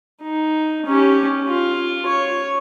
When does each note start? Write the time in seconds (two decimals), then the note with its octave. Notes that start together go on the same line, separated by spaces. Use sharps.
0.22 D#4
0.86 C#4 G4
1.48 F4
2.06 C#5